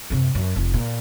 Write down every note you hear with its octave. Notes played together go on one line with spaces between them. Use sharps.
F#2 C3
F#2
F1
A#2